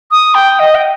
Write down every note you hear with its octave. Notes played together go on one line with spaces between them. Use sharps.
D#6
G5
D#5
G5